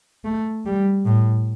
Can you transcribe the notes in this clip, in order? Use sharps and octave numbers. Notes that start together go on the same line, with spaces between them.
A3
G3
A2